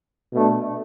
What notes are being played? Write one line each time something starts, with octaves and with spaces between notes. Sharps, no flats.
B2 A3 D4